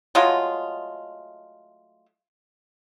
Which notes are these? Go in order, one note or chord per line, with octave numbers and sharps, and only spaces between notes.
F#3 G#3 A3 F4